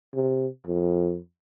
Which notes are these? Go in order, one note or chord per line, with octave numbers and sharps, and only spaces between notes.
C3
F2